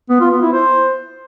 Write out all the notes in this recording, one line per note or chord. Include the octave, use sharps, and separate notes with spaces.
B3
F4
B3
E4
C5